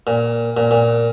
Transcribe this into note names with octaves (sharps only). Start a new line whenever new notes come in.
A#2
A#2
A#2